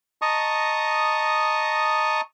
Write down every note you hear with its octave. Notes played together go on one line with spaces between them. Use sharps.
D#5 A5 A#5 C#6 D#6